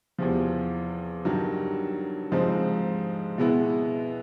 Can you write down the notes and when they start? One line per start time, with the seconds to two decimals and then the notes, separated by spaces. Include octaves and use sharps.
0.18 E2 C3 F3
1.25 G2 D#3 F#3
2.32 G#2 F3 G#3 C4 D#4
3.38 B2 G#3 B3 E4